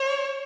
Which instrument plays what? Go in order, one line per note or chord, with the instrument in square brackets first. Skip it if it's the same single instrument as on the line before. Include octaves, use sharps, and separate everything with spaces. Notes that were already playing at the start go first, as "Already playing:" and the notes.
Already playing: [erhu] C#5